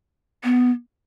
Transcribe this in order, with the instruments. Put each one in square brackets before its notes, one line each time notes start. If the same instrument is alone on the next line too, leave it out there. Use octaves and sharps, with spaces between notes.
[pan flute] B3